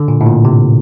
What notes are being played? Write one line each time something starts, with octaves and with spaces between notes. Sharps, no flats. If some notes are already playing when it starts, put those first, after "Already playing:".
Already playing: D3
A#2
A2
A#2
C3